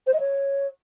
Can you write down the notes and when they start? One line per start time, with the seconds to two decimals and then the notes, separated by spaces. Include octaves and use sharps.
0.06 C5
0.13 D#5
0.20 C#5